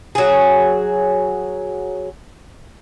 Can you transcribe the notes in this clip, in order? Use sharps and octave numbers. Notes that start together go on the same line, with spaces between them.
F#3 G#4